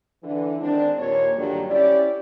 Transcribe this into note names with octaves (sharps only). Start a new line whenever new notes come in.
D3 E3
D#3 G#3 C4 D4
D#2 A#2 C#5
G2 A#2 D3 D#3 F#3 G3
C#4 E4 G4 D5